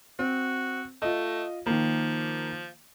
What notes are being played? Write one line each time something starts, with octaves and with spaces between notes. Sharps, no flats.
C4 F#4
A3 F4 D#5
D#3 F3 A#3